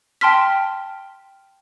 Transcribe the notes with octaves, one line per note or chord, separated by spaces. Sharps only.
G5 A5 C6 F6 B6